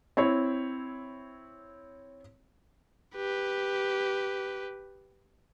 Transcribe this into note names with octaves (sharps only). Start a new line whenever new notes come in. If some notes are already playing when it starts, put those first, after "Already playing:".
C4 E4 C#5
G4 B4